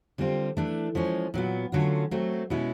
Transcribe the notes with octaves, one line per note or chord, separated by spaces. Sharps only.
D3 G3 C4 F4
E3 A3 D4
F3 G#3 C#4
A#2 F#3 B3
D3 F#3 A3 C#4 F4
F#3 A3 C4
B2 G#3 C#4 E4